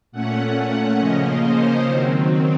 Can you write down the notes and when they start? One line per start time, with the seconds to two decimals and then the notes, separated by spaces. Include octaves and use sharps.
0.12 A#2 A3 C#4 F#5
0.99 C#3 F3 A#3 C#4 D#5
1.42 C5
1.86 D#3 F#3 C4